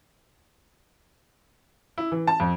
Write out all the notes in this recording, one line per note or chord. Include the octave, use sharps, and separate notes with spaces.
E4
E3
A5
F2